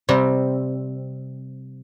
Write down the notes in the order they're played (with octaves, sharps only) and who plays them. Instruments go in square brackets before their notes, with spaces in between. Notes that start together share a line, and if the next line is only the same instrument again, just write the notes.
[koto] C3 G3 C4